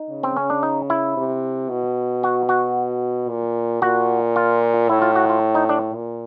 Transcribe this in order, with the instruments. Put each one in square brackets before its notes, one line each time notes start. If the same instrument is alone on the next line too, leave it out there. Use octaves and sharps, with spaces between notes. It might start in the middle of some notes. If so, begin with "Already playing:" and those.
Already playing: [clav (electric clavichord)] D#4
[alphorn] C#3
[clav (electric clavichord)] C4
C#4
D4
D#4
E4
[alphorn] C3
B2
[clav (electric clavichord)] F#4
F#4
[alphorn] A#2
[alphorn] A#2 [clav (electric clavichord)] F#4
[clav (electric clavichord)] F4
[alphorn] A2 [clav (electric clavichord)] E4
[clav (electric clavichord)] F4
F#4
F4
D#4
D4
[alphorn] A#2